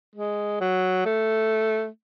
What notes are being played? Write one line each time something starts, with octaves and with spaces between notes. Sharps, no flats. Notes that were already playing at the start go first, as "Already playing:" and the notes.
G#3
F#3
A3